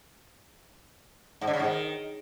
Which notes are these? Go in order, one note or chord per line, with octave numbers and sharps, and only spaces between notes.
G#2
D3
C#3
G#2
D#3